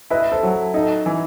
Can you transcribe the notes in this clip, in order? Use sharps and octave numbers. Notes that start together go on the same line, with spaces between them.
E4 B4 D#5
A4 C5
F#3
A4
D#4 A4
E3